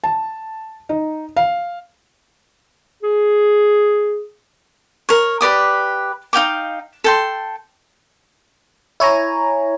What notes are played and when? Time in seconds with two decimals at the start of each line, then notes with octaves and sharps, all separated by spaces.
0.04 A5
0.89 D#4
1.37 F5
3.03 G#4
5.09 A#4 C#5
5.41 G4 B4 D5 D#6
6.33 D#4 F5 G5 D6
7.04 A4 G5 C6
9.00 E4 C#5 G#5 A#5